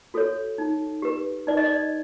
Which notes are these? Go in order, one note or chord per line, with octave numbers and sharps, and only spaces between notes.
F#4 A4 C#5
D#4
G4 B4
D#4 D5
D#5
D5